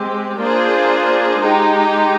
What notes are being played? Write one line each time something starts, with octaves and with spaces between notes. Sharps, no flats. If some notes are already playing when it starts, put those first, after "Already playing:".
Already playing: G#3 C4 G4
A#3 D4 F4 G#4 C5
G#3 D#4 G4